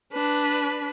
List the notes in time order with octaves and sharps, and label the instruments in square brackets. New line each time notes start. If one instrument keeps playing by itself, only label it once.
[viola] D4 B4